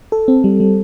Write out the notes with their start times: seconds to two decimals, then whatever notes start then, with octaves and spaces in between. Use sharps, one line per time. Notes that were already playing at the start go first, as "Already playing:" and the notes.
0.12 A4
0.28 C4
0.44 G3
0.60 G3